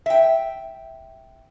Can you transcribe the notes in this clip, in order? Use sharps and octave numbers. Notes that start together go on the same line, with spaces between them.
E5 G5